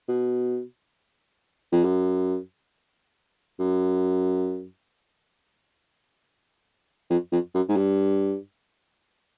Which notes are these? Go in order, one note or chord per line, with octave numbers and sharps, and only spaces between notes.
B2
F2
F#2
F#2
F2
F2
F#2
G#2
G2